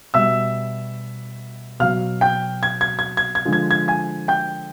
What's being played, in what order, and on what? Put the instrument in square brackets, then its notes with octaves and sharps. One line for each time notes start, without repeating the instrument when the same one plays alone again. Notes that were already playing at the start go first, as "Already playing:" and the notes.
[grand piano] B2 G3 E5 E6
B2 F#3 F5 F6
G5 G6
G#6
G#6
G#6
G#6
G#6
D3 F3 G#3
G#6
G#6
G#5 G#6
G5 G6